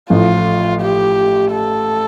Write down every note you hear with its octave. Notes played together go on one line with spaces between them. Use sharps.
A1 A2 F3 F4
G4
A4